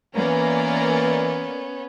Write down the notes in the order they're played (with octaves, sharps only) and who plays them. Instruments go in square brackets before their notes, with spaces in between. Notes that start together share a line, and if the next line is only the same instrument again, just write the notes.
[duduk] E3 [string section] A#3 A#4 D5 [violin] B3 C#4